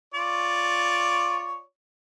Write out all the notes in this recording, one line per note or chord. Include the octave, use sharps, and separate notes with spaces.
F4 C#5 D5